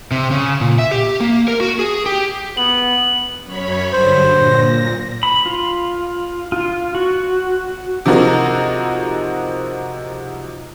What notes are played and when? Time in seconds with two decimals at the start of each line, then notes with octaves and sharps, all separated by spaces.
0.11 C3
0.31 C#3
0.61 A#2
0.78 E5
0.91 G4
1.21 A#3
1.48 A#4
1.61 F#4
1.79 G#4
2.06 G4
2.57 B3 F#7
3.45 F#2 C#5 B5
3.93 G2 D3 F#3 C5
4.32 A#2 A#6
5.23 B5
5.46 F4
6.52 F4
6.95 F#4
8.05 C3 F3 D#4 F#4 G#4 A#4